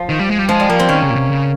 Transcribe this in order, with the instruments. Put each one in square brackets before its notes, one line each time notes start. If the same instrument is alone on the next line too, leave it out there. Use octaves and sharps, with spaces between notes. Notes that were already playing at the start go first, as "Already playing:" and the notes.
Already playing: [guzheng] F3
[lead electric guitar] D#3
G3
G#3
G3
[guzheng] F3 [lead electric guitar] G#3
[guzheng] G3
[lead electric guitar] F3 [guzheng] A#3
[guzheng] C4
[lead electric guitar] D#3 [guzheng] C#4
[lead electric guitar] C#3
A#2
C3
C#3